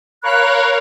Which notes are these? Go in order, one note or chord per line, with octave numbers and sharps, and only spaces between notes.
A#4 C#5 F5 B5 F#6